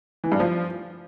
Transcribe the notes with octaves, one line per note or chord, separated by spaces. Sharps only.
E3
G2
F3